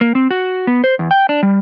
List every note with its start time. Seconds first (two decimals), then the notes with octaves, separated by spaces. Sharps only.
0.01 A#3
0.15 C4
0.31 F#4
0.67 B3
0.84 C5
0.99 E2
1.11 G5
1.29 D4
1.43 G3